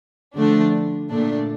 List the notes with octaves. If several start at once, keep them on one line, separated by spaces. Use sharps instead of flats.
D3 F3 A3 D4
A#2 A3 D4